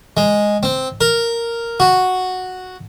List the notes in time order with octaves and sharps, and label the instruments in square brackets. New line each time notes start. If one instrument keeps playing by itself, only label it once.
[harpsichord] G#3
C4
A#4
F#4